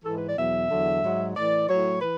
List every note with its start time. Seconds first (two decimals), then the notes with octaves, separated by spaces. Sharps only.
0.04 G#2 E3 A4
0.16 B4
0.27 D5
0.38 E2 B2 F#3 E5
0.70 E2 D3 F#3
1.02 G#2 F#3
1.36 A2 E3 D5
1.68 A2 F#3 C#5
2.01 E3 B4